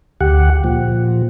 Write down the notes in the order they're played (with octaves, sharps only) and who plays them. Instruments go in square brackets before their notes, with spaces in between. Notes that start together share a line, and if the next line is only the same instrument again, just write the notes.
[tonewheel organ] D2 G4 F#5
A#2 F3